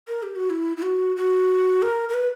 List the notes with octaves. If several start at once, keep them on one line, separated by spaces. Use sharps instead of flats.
A#4
G4
F#4
E4
E4
F#4
F#4
A#4
A#4
B4